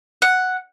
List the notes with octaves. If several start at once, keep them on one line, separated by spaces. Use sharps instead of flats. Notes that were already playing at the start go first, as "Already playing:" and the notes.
F#5